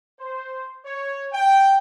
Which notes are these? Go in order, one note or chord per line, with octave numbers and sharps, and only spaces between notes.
C5
C#5
G5